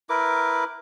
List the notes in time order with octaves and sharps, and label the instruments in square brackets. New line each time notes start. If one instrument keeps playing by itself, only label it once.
[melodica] E4 A#4 B4 D6